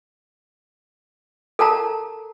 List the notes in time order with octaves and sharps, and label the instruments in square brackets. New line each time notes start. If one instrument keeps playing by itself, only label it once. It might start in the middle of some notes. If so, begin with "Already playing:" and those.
[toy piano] A4 A#4 A5 A#5